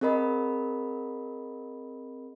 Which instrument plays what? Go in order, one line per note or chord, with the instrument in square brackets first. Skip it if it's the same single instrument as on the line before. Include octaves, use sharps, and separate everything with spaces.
[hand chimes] C4 G#4 A#4 D#5 B5